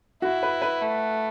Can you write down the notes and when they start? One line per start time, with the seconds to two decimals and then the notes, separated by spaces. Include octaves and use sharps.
0.22 E4 F#4
0.43 B4
0.62 B4
0.82 A3